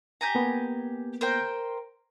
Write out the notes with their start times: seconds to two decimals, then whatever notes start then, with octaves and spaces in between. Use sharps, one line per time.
0.21 G4 G#5 A#5
0.35 A#3 B3
1.21 A#4 C5 G5